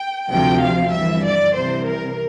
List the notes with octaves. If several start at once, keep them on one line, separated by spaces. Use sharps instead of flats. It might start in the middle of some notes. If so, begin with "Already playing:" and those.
Already playing: G5
D2 C3 F3 G5
F5
G1 G2 E3 E5
D5
C2 C3 E3 C5
A#4